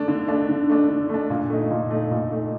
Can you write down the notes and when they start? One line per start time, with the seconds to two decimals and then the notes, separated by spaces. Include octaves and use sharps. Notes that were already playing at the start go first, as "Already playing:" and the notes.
Already playing: A3 D4
0.08 D3
0.28 A3 D4
0.49 D3
0.69 A3 D4
0.89 D3
1.09 A3 D4
1.30 A#2
1.50 A3 D#4
1.71 A#2
1.91 A3 D#4
2.11 A#2
2.31 A3 D#4